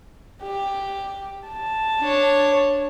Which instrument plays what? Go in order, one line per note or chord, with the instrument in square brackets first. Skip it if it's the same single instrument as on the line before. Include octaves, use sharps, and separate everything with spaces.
[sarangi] G4
A5
[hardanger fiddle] D4 C#5